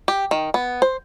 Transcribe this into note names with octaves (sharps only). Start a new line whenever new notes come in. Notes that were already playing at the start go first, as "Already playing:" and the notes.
G4
D#3
B3
C5